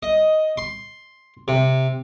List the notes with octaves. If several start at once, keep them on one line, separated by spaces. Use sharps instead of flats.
D#5
C6
C3